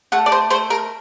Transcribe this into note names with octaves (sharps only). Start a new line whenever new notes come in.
A3 F#5
D5
C5
A3 C5
A#4